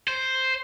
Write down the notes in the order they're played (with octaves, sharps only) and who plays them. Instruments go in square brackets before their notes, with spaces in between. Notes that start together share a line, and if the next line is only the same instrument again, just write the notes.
[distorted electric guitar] C5